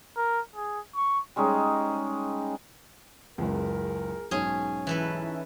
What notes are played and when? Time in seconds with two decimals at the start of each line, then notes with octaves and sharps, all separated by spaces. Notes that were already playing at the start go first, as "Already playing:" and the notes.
0.17 A#4
0.56 G#4
0.96 C#6
1.36 G3 G#3 C#4 D#4
3.38 F#1 C#2 G#4 A#4
4.31 B1 G#2 C#4 G#4
4.87 E3 C#4 D#4 E4 A4 B4